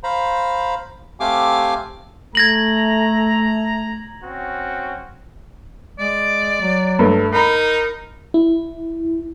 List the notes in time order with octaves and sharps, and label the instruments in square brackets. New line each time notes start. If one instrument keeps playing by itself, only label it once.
[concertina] C5 F5 A#5 B5
A3 C4 G4 F5 G#5 D6
[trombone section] A3 [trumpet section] A#5 [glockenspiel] G#6 A#6 F#7
[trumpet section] C4 C#4 F#4
[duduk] G#3 [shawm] D5
[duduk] F#3
[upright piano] G2 A3
[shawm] D#4 [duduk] A#4 [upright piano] A#5 B5
[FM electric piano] E4